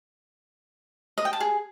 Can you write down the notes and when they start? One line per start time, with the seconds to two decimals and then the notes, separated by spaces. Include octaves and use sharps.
1.18 D#5
1.25 G5
1.33 A5
1.40 G#4